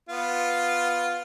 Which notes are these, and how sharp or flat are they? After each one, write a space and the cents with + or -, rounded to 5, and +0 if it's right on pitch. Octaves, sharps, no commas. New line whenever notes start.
B3 +0 F4 +0